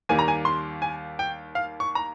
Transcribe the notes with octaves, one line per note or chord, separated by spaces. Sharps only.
D#2 D#3 G3 A#3 G#5
A#5
G#5
C6
G#5
G5
F5
C#6
A#5